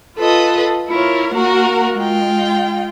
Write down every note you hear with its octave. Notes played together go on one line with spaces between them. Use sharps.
F4 A4 B4 D#5
E4 F4 A#4 C#5
A#3 F#4 A#4 F#5
G#3 F4 G5